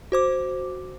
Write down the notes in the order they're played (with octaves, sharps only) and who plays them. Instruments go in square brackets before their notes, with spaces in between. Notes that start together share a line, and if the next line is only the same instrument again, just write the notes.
[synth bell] F#4 C5 D6